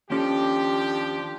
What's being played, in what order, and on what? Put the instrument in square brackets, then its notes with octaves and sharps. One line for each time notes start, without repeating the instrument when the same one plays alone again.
[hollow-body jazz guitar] D#2 C#4 A4 [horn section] F3 D4 G4